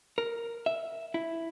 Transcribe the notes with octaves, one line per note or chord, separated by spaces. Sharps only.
A#4
E5
E4